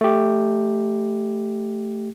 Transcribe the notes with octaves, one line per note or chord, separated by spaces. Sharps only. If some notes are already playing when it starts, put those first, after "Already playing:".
A3 G4